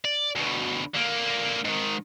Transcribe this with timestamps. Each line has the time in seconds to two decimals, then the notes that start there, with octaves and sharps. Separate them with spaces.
0.05 D5
0.36 D2 B2
0.94 D3 A#3
1.65 G#2 D#3